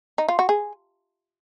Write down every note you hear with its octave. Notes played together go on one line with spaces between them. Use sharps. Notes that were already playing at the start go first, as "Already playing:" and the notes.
D#4
F4
F#4
G#4